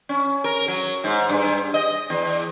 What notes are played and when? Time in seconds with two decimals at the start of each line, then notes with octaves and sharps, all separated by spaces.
0.09 C#4
0.44 A#4
0.68 F#3
1.04 G#2
1.29 G2
1.74 D#5
2.10 E2